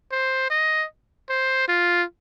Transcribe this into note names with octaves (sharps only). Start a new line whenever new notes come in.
C5
D#5
C5
F4